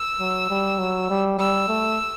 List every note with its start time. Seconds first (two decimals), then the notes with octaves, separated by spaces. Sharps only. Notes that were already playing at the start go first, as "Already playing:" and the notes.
Already playing: E6
0.20 F#3
0.50 G3
0.79 F#3
1.10 G3
1.38 G3 E6
1.68 A3